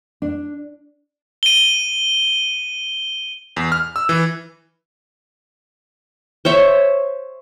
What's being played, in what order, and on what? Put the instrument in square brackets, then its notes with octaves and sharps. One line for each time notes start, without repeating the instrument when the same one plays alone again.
[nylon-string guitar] D4
[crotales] D#7 G7
[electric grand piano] E2
F6
E6
E3
[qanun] C5 C#5 E5